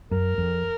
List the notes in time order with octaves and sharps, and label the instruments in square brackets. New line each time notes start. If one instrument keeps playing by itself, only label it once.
[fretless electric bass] F#2 [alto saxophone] A#4
[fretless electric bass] F2